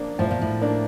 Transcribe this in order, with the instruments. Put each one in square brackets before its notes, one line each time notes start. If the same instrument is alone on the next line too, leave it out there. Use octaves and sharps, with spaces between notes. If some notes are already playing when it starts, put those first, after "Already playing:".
Already playing: [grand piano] F3 A#3 D4
[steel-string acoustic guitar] A2 [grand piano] F3
[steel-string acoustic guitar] A#2
A2
[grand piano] A#3 D4